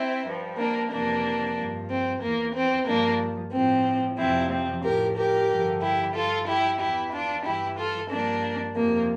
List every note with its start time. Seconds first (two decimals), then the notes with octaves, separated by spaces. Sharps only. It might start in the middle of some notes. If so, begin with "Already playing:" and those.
Already playing: C4 E4
0.26 G2 F3
0.58 A#3 D4
0.91 F2 C3 E3 A#3 D4
1.57 G2 F3
1.90 C4
2.22 E2 E3 A#3
2.56 C4
2.87 G2 F3 A#3 D4
3.53 A2 F3 C4
4.18 F2 C3 F3 C4 E4
4.51 C4
4.84 A2 F3 G4 A#4
5.16 G4 A#4
5.49 G2 D3 F3
5.81 E4 G4
6.14 G2 F3 F4 A4
6.47 E4 G4
6.80 E2 E3 E4 G4
7.12 D4 F4
7.45 G2 E3 E4 G4
7.78 F4 A4
8.10 G2 F3 A#3 D4
8.75 F2 C3 F3 A#3